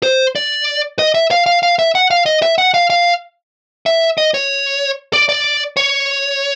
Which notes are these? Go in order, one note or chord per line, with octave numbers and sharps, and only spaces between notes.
C5
D5
D#5
E5
F5
F5
F5
E5
F#5
F5
D#5
E5
F#5
F5
F5
E5
D#5
C#5
D5
D5
C#5